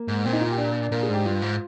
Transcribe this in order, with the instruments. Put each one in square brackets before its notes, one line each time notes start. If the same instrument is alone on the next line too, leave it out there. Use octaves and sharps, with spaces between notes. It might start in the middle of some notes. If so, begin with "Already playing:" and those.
Already playing: [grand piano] A#3
[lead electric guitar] G#2
[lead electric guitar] A#2 [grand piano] C4
[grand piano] D#4
F4
G4
D4
[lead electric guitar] A#2 [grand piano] A#4
[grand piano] G#4
[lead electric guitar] G#2 [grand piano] G4
[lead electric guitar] G2 [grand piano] F4
[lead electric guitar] G#2